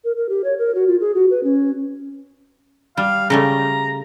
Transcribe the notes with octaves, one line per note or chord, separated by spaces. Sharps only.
A#4
A#4
G4
C#5
A#4
F#4
F4
G#4
F#4
B4
C#4
G3 F5
C#3 G3 A3 A#5